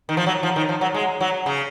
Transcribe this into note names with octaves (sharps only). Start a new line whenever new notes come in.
D#3
F3
F#3
F3
D#3
F3
F#3
G#3
F#3
C#3